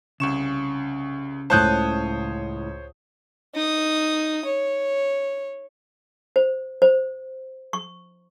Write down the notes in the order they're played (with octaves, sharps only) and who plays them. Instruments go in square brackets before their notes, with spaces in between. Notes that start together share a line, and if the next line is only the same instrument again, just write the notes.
[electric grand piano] C2 C#6 E7 [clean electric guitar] C#3
[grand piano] C#2 A2 [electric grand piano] C5 C#5 D#6 [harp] A5 F#6 G6
[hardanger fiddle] D#4 D#6
C#5
[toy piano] C5
C5
C#6